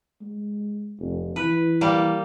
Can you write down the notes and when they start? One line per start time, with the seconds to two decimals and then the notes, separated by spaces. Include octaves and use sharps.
0.21 G#3
1.00 F1
1.36 E3 B4
1.81 G3 A#3